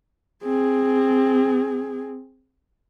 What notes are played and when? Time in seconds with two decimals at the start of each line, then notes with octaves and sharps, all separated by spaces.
0.43 C4 G#4